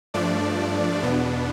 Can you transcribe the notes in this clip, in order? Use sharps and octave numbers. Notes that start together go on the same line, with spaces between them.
G2 F3 A3 D4 D5
E2 B2 B3 D4